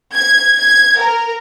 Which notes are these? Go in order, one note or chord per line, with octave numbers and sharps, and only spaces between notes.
G#6
G#6
A#4